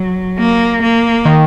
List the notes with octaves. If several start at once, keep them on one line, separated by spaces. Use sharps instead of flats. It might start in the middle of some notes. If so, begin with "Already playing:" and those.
Already playing: F#3
A#3
A#3
D#3